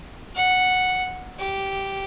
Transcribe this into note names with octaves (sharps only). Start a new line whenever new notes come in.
F#5
G4